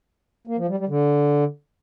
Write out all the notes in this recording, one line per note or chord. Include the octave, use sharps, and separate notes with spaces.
A#3
F3
G3
G3
D3